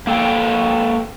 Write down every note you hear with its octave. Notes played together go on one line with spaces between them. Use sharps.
A#3 A4 G5